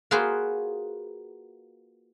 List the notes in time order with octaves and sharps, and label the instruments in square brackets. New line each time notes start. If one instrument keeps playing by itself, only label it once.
[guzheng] A#3 F4 F#4 G#4 B4 C5